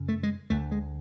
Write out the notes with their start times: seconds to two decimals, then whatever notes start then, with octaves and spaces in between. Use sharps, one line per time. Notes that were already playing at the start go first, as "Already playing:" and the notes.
Already playing: F#2 C#3
0.09 A3
0.23 G#3
0.50 D2 D3 A3
0.71 G#3